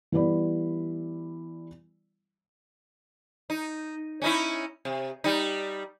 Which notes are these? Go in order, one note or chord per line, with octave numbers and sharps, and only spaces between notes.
E3 G3 B3 E4 D5 B5
D#4
C#4 D#4 E4
C3
G3 D#4